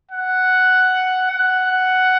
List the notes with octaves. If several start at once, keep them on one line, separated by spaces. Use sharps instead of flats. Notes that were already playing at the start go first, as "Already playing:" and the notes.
F#5
F#5